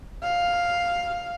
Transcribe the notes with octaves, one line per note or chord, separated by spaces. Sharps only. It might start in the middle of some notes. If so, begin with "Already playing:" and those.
F5